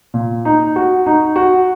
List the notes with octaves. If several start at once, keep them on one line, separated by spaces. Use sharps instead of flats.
A#2
D#4
F#4
D#4
F#4